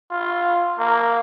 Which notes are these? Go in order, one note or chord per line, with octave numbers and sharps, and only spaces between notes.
F4
A#3